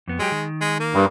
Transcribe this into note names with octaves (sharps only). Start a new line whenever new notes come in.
F2 B3
F#3 G#3 G4
D#3
G#3
A#3
G2